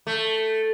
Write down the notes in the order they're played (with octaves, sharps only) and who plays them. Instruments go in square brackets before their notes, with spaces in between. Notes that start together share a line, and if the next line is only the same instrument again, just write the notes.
[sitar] A3